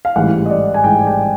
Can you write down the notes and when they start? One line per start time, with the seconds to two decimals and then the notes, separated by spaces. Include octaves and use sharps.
0.05 F5
0.16 A1 G#2 E3 G3 F#5
0.46 D#5
0.50 D5
0.74 G#5
0.84 A1 G#2 E3 G3 G5
1.07 G5